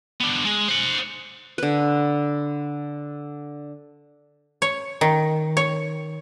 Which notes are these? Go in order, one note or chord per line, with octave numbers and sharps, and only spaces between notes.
B3 D4
G#3
C5 F#5
D3 B4
C#5
D#3
C#5